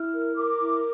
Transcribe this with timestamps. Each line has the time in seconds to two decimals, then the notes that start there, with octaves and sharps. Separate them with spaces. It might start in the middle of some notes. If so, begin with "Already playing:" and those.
Already playing: E4 F6
0.13 A#4
0.36 A#4 D6
0.60 E4